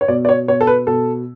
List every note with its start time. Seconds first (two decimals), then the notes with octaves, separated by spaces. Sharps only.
0.01 C#5
0.08 B2 D5
0.25 D5
0.29 C#5
0.48 B2 C#5
0.61 A4
0.67 B4
0.87 B2 A4